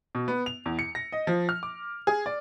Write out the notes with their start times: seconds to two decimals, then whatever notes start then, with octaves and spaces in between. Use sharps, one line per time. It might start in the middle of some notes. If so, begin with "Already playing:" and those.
0.15 B2
0.28 B3
0.46 F7
0.66 E2
0.79 C#7
0.95 A#6
1.12 D#5
1.27 F3
1.49 F6
1.63 D6
2.07 G#4
2.26 D5